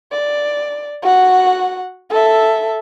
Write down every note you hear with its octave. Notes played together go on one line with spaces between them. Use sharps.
D5
F#4 F#5
A4 E5